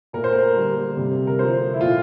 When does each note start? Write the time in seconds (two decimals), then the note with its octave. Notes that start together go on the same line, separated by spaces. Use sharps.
0.13 A#2 A3 A#4
0.24 C5
0.33 A#4
0.56 D3 G3 A#3
0.97 C3 G3 A#3
1.27 A#4
1.39 D3 F3 A3 C5
1.74 E4
1.81 A#2 A3 F4